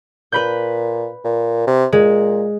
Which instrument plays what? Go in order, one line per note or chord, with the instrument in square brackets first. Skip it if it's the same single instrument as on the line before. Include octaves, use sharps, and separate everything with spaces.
[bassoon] A#2 [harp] B4 B5 G6
[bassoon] A#2
C3
[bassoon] A#2 [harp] G#3